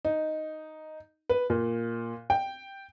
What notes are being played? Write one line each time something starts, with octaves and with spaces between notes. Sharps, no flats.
D#4
B4
A#2
G5